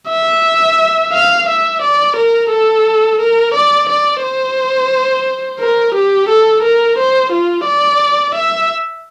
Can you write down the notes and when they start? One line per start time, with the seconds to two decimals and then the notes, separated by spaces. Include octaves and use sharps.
0.10 E5
1.13 F5
1.48 E5
1.82 D5
2.16 A#4
2.51 A4
3.20 A#4
3.54 D5
3.89 D5
4.23 C5
5.60 A#4
5.94 G4
6.29 A4
6.63 A#4
6.98 C5
7.32 F4
7.66 D5
8.35 E5